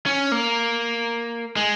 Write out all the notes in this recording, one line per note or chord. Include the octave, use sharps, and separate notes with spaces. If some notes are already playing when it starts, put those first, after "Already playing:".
C#4
A#3
G#3